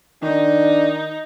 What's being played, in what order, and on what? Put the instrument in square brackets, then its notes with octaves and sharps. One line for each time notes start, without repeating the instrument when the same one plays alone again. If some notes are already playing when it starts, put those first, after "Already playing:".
[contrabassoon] D#3 [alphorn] D4 [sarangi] D#4